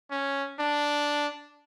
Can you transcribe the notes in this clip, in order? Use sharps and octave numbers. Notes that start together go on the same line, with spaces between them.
C#4
D4